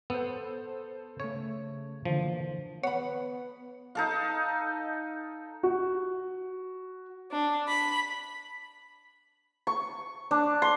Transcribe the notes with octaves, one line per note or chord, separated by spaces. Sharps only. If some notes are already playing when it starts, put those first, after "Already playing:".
B3 A4 C5
C#3 A3 C#5
D3 E3 F3 A#3
B3 C#5 F#5 B5
D#4 A4 F5
F#4
D4
B5
C#6
D4
C6